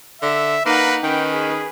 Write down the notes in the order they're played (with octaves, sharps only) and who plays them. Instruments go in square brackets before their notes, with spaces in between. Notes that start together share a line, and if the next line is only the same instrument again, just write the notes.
[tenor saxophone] D3 [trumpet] E5
[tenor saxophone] A#3 [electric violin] D#4 F#5 [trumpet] B4
[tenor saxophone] D#3 [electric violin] C#4 B4 [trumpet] G5
[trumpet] G#4